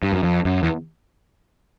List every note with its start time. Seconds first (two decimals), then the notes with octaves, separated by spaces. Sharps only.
0.03 G2
0.13 F#2
0.23 F2
0.45 F#2
0.63 E2